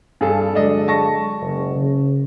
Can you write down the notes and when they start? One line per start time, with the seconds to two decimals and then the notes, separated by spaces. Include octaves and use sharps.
0.21 G2 G#4 A4
0.55 D3 F#3 G#3 D4 A4 D#5
0.88 A5 C#6 A#6
1.41 F#1
1.75 C#3